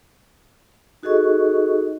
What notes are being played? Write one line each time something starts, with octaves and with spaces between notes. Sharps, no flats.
D#4 F#4 G#4 A4 D#5 C#6